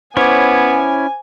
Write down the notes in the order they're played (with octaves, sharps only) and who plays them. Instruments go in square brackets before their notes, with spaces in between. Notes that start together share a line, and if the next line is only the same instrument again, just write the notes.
[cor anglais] B3 [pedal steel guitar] C#4 E4 C#5 [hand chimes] C5 D6 [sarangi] G#5